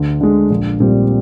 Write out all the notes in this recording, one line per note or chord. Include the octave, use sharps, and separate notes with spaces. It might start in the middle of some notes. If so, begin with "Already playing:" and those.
Already playing: D2
D3 G#3
A#1
A#2 G3 C4